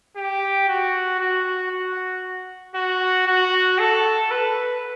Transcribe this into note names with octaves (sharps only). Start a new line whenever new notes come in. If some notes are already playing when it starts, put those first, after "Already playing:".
G4
F#4
F#4
F#4
F#4
F#4
A4
B4